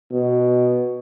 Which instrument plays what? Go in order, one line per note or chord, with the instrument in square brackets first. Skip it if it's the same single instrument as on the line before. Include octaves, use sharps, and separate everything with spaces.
[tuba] B2